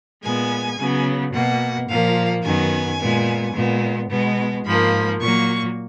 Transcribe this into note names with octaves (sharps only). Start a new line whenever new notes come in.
A#2 G#3 B3 G#5
C#3 F#3 B3
B2 A#3 F#5
A#2 F3 A#3 F5
F#2 D#3 F#3 B3 G#5
A#2 G#3 B3
A#2 G#3 B3
B2 G#3 B3
G#2 F3 A#3 B5
A#2 F#3 A#3 C#6